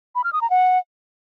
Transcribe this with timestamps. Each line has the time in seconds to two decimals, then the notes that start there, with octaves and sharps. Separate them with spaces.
0.15 B5
0.24 F6
0.33 D#6
0.41 A#5
0.50 F#5